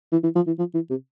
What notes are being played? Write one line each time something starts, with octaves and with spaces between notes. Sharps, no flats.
E3
E3
F3
E3
F3
E3
C3